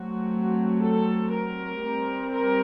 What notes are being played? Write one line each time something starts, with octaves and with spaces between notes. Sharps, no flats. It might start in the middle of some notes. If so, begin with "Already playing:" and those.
Already playing: F#3 A3 C4 F#4
A4
A#4
G3 C4
A#4